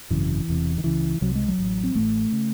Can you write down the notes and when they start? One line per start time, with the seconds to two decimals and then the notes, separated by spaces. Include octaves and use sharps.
0.10 G#1 F#2 C#3 E3
0.48 E1 E2 C3
0.78 D#3
0.84 C#2 C#3 E3
1.21 C2 C3 F#3
1.35 G#3
1.48 F#3
1.58 A1 A2
1.84 C4
1.95 A1 A2 A3
2.32 C#3